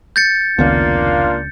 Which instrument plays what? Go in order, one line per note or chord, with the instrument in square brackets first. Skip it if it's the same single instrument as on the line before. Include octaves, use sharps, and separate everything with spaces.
[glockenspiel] G6 A6 C#7
[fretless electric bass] F1 D#3 B3 [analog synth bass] C#2 [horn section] A#3 D4 F4